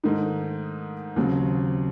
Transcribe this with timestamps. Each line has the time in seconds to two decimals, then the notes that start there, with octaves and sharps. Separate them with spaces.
0.04 G#2 D#3 A3 D#4
1.16 D#2 C#3 F#3 C4